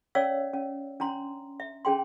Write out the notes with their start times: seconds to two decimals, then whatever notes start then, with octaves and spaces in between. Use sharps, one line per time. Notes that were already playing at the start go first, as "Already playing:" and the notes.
0.15 C#4 C#5 D5 F5 E6
0.54 C#4
1.00 C#4 D4 A#5 C6
1.60 E5
1.85 C#4 D4 G#4 G5 C6